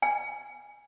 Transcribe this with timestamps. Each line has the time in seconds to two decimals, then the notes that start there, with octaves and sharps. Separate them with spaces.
0.02 G#5